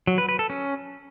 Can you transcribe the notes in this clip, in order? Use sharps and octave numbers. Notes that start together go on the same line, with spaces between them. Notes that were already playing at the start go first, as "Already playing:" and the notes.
F#3
B4
B4
A4
C#4